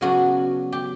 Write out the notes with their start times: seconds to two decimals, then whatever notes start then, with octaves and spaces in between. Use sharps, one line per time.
0.01 C#3 F#3 B3 D4 F#4
0.72 G4